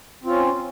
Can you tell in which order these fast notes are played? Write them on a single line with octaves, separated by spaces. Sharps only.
C4 F4 C#4